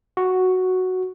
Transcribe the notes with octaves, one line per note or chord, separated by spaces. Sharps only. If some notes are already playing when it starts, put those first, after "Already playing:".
F#4